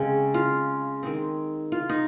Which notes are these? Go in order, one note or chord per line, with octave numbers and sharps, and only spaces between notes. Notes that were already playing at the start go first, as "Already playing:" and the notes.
Already playing: C#3 G#3 C4 C#4
F4
D#3 G#3 C4
F4
D#4